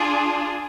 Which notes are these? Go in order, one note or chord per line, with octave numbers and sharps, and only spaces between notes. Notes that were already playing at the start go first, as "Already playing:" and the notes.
Already playing: D4 F4 G#4